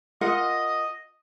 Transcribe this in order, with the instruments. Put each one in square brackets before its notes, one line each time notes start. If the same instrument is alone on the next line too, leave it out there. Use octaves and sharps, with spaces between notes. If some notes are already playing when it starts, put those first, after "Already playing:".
[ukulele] F4 A#4 F#5 [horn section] D#5